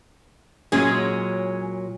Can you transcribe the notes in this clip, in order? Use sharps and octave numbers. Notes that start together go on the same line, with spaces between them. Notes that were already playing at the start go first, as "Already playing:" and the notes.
A#2 F#3 G#3 C#4 G#4